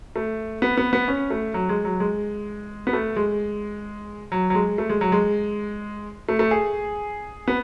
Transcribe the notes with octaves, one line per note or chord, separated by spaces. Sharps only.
A3
B3
B3
B3
C#4
A3
F#3
G#3
F#3
G#3
B3
A3
G#3
F#3
F#3
G#3
A3
G#3
F#3
G#3
A3
A3
G#4
B3